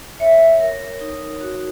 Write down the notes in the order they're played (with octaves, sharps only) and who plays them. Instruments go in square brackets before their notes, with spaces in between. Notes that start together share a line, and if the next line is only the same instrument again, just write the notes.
[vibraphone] C#5 [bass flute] E5
[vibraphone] A#4
D#4
F#4